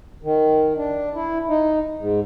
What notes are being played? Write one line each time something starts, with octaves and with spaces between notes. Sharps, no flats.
D#3
D4
E4
D#4
G#2